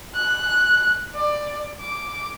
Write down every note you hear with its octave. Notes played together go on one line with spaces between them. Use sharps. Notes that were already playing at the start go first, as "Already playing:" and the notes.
F#6
D5
D6